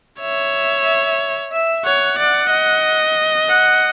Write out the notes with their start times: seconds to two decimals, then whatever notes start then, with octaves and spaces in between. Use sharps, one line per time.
0.20 C#5 E5
1.52 E5
1.85 C#5 F#5
2.18 D5
2.51 D#5
3.49 F#5